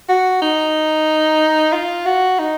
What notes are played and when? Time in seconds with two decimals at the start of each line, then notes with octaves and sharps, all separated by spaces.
0.09 F#4
0.42 D#4
1.73 F4
2.06 F#4
2.39 D#4